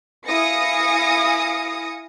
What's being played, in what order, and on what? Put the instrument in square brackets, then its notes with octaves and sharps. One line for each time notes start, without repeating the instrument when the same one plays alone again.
[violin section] E4 F5 G#5 D#6 A#6 C#7